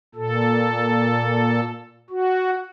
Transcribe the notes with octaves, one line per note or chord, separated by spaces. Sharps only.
A#2 A4
F#4